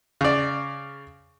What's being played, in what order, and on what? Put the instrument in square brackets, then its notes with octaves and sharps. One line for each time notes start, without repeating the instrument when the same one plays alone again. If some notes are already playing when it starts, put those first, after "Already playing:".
[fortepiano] C#3 D5